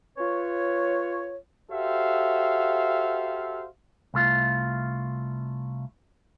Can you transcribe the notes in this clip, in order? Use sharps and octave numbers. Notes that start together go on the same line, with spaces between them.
F4 B4 C#5
F#4 G4 A4 C5 E5 F5
C2 A3 F4